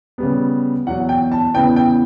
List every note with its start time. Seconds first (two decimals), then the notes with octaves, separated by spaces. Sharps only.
0.18 C#3 G3 B3
0.87 E2 B2 F#3 F#5
1.09 G5
1.32 A5
1.54 E2 C#3 E3 B3 G5
1.76 G5